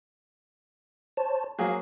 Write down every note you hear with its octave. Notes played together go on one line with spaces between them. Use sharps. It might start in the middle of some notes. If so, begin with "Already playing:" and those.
C5 C#5 A5
F#3 A#3 G#4 F5